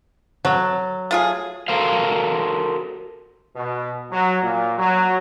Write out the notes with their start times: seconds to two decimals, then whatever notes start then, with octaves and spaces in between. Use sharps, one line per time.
0.45 F#3 A4
1.11 A3 F4 G#4
1.68 F#4 A4 A#4 C5 F5
3.55 B2
4.10 F#3
4.42 A#2
4.78 F#3